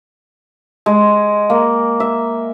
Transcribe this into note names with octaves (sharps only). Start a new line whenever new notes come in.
G#3
A#3
E5